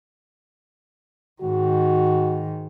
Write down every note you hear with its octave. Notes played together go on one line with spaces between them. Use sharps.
G#2 D#3 F#4